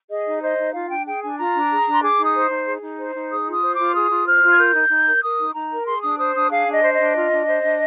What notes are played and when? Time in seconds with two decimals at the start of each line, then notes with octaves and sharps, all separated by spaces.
0.10 G#4 D#5
0.26 D#4
0.42 C5 D#5
0.58 D#4
0.74 F4 F5
0.90 D4 G5
1.06 G#4 G5
1.22 D4 G#5
1.38 F4 A#5
1.54 D4
1.70 G#4
1.86 D4
1.93 C6
2.02 G#4 D6
2.18 D#4
2.23 D#6
2.34 C5
2.50 D#4
2.66 G#4
2.82 D#4
2.98 C5
3.14 D#4
3.30 G#4 D#6
3.46 F4
3.52 D#6
3.63 C5
3.73 D6
3.79 F4
3.94 G#4 D#6
4.10 F4
4.26 C5 F6
4.42 F4
4.51 G#6
4.59 A#4 G6
4.74 D#4
4.90 D#4
5.07 A#4
5.23 A#4 D#6
5.39 D#4
5.55 D#4 A#5
5.71 A#4
5.87 G#4 C6
6.03 D4 D#6
6.19 C5 D#6
6.35 D4 D#6
6.51 G#4 F5
6.67 D4 D#5
6.83 C5
6.93 D#5
6.99 D4
7.15 F4
7.31 D4
7.47 C5
7.63 D4